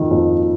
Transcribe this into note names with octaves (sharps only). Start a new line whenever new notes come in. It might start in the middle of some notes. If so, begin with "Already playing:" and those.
Already playing: F2 D#3
F2